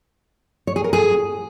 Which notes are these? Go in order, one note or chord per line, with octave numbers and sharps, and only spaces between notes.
C#5
G#4
A#4
G#4